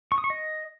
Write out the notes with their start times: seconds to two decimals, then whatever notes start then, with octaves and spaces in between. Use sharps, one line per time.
0.12 C#6
0.18 D#6
0.24 C#6
0.30 D#5